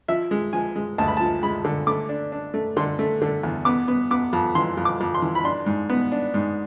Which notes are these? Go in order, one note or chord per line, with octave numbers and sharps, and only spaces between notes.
F3 E5
G#3
F3 G#5
G#3
D2 A5
B5
F3 A5
G#3 B5
D3
A3 D6
D4
D4
A3
D3 C6
A3
D3
E2
B3 D6
B3
B3 D6
F2
E3 C6
F2
D6
F2
C6
E3
B5
D4 C6
G#2
B3
D4
G#2